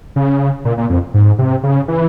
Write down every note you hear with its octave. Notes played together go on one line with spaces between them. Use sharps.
C#3
A#2
A#2
F2
G#2
C3
C#3
E3